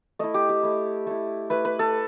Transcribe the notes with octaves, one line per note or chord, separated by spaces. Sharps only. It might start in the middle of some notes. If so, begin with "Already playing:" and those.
A3 E4 D#5
G4
G4
A3 E4
A3 E4
A3 E4 B4
B4
A4